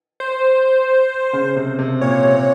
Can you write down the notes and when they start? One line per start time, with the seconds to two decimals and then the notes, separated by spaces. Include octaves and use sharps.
0.20 C5
1.33 C#3
1.56 C3
1.79 C3
2.01 A#2 C#5
2.24 C3